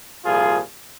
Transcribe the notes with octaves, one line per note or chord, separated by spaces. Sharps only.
C2 A#2 F3 F4 G#4